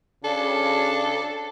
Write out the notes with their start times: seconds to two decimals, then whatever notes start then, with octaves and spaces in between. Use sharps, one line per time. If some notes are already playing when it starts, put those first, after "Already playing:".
0.24 C#3 D4 A4